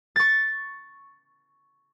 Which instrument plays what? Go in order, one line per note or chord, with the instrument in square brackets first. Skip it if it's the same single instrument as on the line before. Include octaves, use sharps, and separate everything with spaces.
[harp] C#6 A6